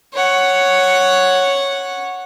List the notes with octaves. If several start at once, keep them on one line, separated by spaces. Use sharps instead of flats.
C#5 F#5